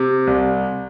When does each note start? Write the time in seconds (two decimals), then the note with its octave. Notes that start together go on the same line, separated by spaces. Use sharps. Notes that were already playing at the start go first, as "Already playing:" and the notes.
Already playing: C3
0.27 C2